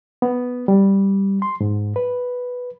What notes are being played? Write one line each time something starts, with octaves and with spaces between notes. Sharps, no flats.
B3
G3
C6
G#2
B4